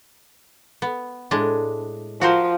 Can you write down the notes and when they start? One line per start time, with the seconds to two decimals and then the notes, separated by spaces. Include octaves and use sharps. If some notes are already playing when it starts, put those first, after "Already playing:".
0.82 B3
1.31 A2 G#3 D4
2.21 F3 F#4 A#4 C5